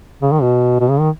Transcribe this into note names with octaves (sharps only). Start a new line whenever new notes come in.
C#3
D#3
B2
B2
C#3
D#3